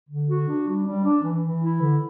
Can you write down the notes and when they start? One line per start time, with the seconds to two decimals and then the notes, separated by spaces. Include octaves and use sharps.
0.09 D3
0.28 F#4
0.47 D4
0.67 G3
0.85 G3
1.04 D4
1.22 E3
1.41 E3
1.60 E4
1.80 D3